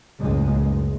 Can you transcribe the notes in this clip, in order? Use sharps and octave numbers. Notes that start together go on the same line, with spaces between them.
F#1 C#2 A2 C#3 G#3
F#1